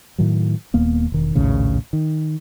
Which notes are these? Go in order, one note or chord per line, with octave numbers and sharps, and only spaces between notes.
A2 D#3 F#3
D#1 D#2 A#3 B3
E1 D#3
A#1 D#2 A2 C#3
D#3